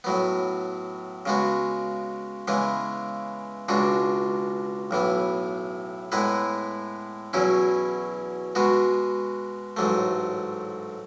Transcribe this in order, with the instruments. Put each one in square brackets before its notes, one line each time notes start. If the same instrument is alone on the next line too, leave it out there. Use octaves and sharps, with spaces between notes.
[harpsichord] A2 F#3 B3
C#3 G#3 B3 F#4
C#3 E3 G#3 B3
C#2 B2 G#3 D4 F#4
B1 A2 E3 B3
A2 G#3 B3 E4 B4
E2 B2 F#3 C#4 E4
B2 G#3 B3 F#4
A1 G#2 F#3 A3